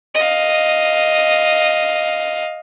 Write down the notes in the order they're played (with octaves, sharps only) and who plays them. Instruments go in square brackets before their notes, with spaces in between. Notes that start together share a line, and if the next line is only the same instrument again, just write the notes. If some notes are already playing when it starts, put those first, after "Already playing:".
[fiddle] D#5 F5